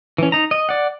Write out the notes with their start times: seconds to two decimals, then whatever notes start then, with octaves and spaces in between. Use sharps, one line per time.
0.18 E3 C#4
0.32 D#4 A#5
0.51 D#5
0.69 D5 F#5